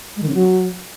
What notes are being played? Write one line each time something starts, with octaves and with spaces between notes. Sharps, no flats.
G#3
D#3
C#3
F#3